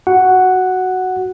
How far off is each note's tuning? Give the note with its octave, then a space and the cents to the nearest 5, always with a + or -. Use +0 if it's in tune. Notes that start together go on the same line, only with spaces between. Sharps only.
F#4 +5 F#5 +0